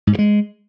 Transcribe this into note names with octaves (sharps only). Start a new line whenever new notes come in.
G#2
G2
G#3